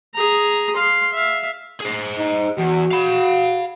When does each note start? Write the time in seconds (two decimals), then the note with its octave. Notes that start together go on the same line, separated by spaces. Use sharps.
0.14 G#4 A#5
0.76 F5 C6
1.13 E5 F5
1.81 G#4 C5
2.18 D#4
2.59 E2 F#4
2.91 F5 B5